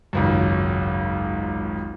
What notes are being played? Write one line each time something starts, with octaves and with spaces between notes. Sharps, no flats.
G#1 C#2 F#2